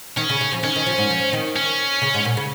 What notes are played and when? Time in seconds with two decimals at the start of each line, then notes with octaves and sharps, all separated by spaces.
0.17 D#3 C#4
0.29 C#3
0.41 C#3
0.52 F3
0.63 D#3 C#4
0.76 D#3
0.86 F3
0.98 G#2
1.10 F3
1.33 D#3
1.56 C#4
2.02 C#3
2.14 G#2
2.25 A#2
2.37 C#3